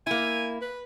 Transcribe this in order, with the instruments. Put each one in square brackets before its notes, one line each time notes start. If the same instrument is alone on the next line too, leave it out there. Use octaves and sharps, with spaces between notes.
[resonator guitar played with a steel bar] A#3 E4 [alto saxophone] G#5
[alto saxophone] B4